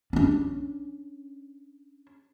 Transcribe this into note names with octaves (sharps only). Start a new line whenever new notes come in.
C#4 D4